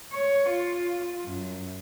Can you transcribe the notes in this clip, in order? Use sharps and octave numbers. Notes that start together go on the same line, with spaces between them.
C#5
F4
F#2